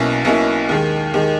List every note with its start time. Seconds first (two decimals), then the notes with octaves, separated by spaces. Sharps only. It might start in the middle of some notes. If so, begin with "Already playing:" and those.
Already playing: B1 B2 A#3 C#4 E4
0.25 B1 B2 A#3 C#4 E4
0.69 D#2 D#3 G#3
1.14 D#2 D#3 G#3